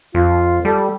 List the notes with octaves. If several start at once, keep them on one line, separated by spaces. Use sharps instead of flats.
F2 F4
G3 A4